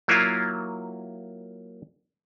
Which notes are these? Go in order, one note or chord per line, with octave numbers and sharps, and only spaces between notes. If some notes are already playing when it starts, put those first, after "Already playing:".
F#3 A#3 E4 F4